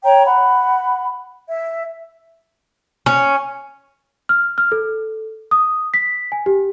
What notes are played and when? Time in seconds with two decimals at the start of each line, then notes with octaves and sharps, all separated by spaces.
0.04 C#5 G5 A#5
0.26 F#5 B5
1.48 E5
3.06 C#4
4.29 F6
4.58 F6
4.72 A4
5.51 D#6
5.94 B6
6.32 G#5
6.46 G4